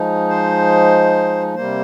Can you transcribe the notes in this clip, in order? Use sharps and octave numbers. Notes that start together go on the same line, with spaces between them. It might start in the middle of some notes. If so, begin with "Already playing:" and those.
Already playing: F3 G#3 D#4
C5
C3 G3 A#3 C5